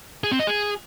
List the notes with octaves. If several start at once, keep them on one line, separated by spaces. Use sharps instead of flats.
G#4
C4
D#5
G#4